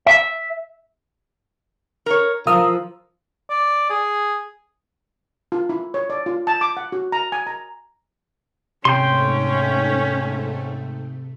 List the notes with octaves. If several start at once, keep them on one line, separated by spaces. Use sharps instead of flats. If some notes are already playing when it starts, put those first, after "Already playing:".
E5
A#4 C#5
F3 A#4 F5 D#6 E6
D5
G#4
F4
E4
C#5
D5
F4
A5
D6
F#5
F#4
A#5
G#5
A#5
G#2 C3 A3 C#4 G5 C6